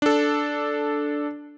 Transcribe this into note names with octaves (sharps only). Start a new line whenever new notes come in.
D4 A4